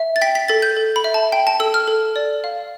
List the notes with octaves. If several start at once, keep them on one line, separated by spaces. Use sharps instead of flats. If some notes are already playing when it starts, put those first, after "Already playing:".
Already playing: E5
A6
G5 B6
B6
A4 A6
G6
A4
B5
E5
A5
G5
A5
A4 E6
F6
A4
D5
F5